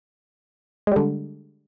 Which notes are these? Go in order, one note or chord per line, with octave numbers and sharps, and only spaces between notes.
D3 G3 G#3